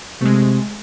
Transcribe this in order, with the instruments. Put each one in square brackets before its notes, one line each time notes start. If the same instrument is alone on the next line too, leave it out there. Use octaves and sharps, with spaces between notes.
[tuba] C3 [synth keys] G#3 A3